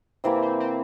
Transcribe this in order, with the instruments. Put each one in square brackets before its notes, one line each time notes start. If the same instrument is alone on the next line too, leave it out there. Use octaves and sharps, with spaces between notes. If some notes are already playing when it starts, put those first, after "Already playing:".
[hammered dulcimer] C3 E3 A#3 [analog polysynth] C4
[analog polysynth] C4
C4